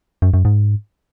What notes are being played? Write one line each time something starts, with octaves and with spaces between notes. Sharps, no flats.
F#2
F#2
G#2